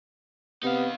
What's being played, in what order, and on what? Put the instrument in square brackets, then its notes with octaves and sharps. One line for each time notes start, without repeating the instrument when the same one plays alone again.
[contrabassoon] C3 [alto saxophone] B3 [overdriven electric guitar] D#4 F5